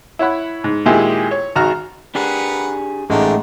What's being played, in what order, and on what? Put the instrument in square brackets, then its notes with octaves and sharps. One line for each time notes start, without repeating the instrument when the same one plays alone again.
[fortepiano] E4 C#5 F#5 B5
G#2
A#2 D#3 G#3 E4 G4 G#4
C#5
G#1 F#4 A#5 F6
[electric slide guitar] D4 G4 G#4 [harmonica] A#4 B4 F#5
[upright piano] A1 [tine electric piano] G#3 A3 D#4 [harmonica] D4 A#4 G5